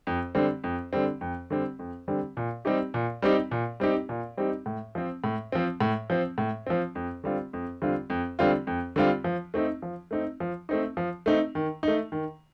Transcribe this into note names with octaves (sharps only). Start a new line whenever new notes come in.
F2
D3 G3 C4
F2
D3 G3 C4
F2
D3 G3 C4
F2
D3 G3 C4
A#2
G3 C4 D#4 G4
A#2
G3 C4 D#4 G4
A#2
G3 C4 D#4 G4
A#2
G3 C4 D#4 G4
A2
F3 C4
A2
F3 C4
A2
F3 C4
A2
F3 C4
F2
D3 G3 C4 F4
F2
D3 G3 C4 F4
F2
D3 G3 C4 F4
F2
D3 G3 C4 F4
F3
A3 C4 D#4
F3
A3 C4 D#4
F3
A3 C4 D#4
F3
A3 C4 D#4
D#3
A3 D#4
D#3